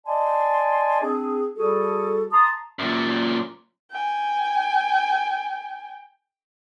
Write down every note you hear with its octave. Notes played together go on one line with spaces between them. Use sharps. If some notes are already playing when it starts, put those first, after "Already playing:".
D5 D#5 G#5 A5 C6
C4 D4 G#4
G3 F#4 G#4 A4
A5 A#5 C6 D#6
F#2 A#2
G5 G#5